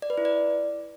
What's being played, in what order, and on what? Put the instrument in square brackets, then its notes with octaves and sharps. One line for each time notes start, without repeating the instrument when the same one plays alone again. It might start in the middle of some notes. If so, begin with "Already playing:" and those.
[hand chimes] D5
B4
E4
D5